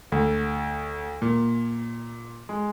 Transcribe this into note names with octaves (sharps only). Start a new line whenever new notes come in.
D2
A#2
G#3